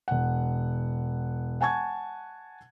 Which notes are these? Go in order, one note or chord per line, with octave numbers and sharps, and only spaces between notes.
E1 F#5
F#5 G#5 A5 C#6 G#6